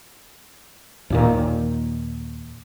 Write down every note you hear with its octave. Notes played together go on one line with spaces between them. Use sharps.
D#2 A#2 D#3